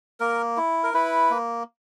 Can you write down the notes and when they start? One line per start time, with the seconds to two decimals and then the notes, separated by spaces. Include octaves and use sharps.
0.20 A#3 A#4
0.57 E4
0.84 A#4
0.94 E4 B4
1.31 A#3